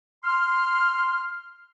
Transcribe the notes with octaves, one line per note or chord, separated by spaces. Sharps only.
C6 F6